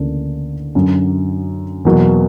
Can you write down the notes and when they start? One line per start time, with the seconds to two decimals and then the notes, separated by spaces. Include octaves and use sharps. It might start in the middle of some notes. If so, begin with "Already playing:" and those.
Already playing: D2 C#3 E3 A#3 D4
0.75 F#2 D3 F#3
1.85 E2 B2 F#3 A#3